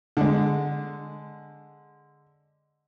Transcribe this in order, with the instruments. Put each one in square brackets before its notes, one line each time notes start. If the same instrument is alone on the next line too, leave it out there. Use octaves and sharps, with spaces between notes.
[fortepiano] D3 G#3